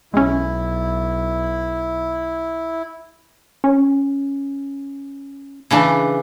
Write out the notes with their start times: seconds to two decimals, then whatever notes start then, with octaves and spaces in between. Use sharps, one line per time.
0.14 B1 G#3 C#4 E4
3.64 C#4
5.71 C#3 E3 D4